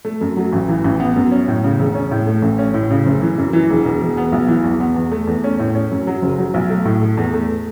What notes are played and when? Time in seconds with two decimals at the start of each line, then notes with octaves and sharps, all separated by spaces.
0.05 A3
0.21 F#2
0.37 F#3
0.53 A1
0.69 E3
0.84 A1
1.00 B3
1.16 F#2
1.31 C#4
1.48 A2
1.64 C#3
1.79 E1
1.95 C#4
2.11 A2
2.27 A3
2.42 A1
2.58 C#4
2.74 A2
2.91 C#3
3.06 F#1
3.22 E3
3.38 F#2
3.53 E3
3.70 E1
3.85 B2
4.01 E1
4.17 B3
4.32 B1
4.48 E3
4.64 E2
4.80 B3
4.96 E2
5.11 A3
5.27 E2
5.44 C#4
5.59 A2
5.75 C#4
5.91 F#2
6.07 F#3
6.22 F#1
6.38 F#3
6.54 B1
6.70 A3
6.85 A2
7.02 A3
7.17 E2
7.34 A3